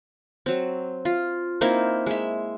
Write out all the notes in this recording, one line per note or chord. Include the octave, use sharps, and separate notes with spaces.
F#3 C4
F4
A#3 C4 D#4 E4
G#3 E5